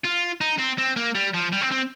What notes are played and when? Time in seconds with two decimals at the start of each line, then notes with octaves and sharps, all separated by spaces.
0.04 F4
0.41 D#4
0.59 C4
0.78 C4
0.96 A#3
1.15 G3
1.34 F3
1.52 G3
1.61 C4
1.71 C4